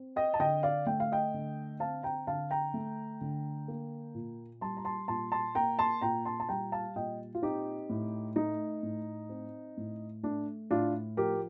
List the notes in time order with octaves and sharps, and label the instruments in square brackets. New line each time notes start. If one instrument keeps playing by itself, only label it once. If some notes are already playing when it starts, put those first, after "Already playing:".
Already playing: [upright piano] C4
D#5 G5
A5
D3 D#5 G5
D5 F5
A3 G5
F5
D#5 G5
D3
C4 F5 A5
G5 A#5
D3 F5 A5
G5 A#5
A3
D3
A#3
A#2
G3 A5 C6
A#5
A5 C6
A#2 A5 C6
A5 C6
A#3 G5 A#5
A5 C6
A#2 G5 A#5
A5 C6
A5
G3 G5 A#5
F5 A5
A#2 D#5 G5
F4
C4 D#4 G4
A2
A3 D#4
A2
C4
A2
A3 D4
A2 D4 F4
F3 G4 A#4